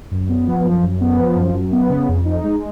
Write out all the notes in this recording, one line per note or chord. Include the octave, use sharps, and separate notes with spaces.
F#2
B3
F3
F#2
F#2
B3
F3
F#2
F#2
B3
C#3
F2
D#4
G#3